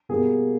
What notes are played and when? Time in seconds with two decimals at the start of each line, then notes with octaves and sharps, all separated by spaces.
0.09 B2 G3 A#3 G#4